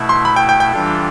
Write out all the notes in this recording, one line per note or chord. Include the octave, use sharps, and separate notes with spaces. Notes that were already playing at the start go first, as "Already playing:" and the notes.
Already playing: B2 A3 E4
C6
B5
G5
G5
G5
E3 G3 D4 F4 A4